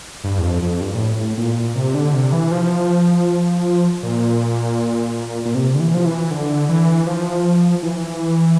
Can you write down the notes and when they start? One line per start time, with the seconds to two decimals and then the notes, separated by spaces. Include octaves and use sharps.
0.24 G2
0.38 E2
0.43 F2
0.62 F2
0.81 G2
0.95 A#2
0.99 A2
1.37 A#2
1.75 C3
1.94 D3
2.14 C3
2.32 E3
2.51 F3
4.03 A#2
5.45 A#2
5.55 C3
5.75 D3
5.80 E3
5.94 F3
6.05 E3
6.31 D3
6.69 E3
7.06 F3
7.83 E3